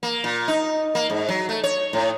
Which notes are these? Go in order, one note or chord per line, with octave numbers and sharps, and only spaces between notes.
A#3
A#2
D#4
A#3
G#2
F#3
A3
C#5
A2